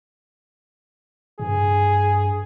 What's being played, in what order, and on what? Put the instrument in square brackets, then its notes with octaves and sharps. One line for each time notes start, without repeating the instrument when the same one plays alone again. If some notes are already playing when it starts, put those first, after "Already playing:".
[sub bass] G2 [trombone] G#4